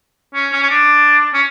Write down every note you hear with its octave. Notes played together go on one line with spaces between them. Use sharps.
C#4
C#4
C#4
D4
C#4